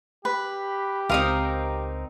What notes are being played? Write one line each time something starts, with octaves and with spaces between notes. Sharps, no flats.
G4 B4
C#2 C4 D#4 A#4 F5 D#6